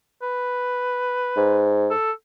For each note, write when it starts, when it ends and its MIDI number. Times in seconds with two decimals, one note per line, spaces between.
0.22 1.78 71
1.36 1.90 44
1.90 2.12 69